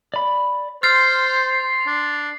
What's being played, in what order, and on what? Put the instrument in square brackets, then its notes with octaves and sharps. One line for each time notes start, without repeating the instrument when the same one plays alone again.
[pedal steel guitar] D5 B5
[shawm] C5 [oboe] C6 [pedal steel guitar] F6 [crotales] A6 C7
[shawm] D4